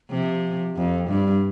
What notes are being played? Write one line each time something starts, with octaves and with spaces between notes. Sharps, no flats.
C3 F3
F2 F3
G2 G3